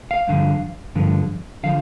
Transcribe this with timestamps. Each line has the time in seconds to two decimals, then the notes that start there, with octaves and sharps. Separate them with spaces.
0.11 F5
0.28 G2 D3 F3
0.95 G2 D3 F3
1.63 D3 F3 F5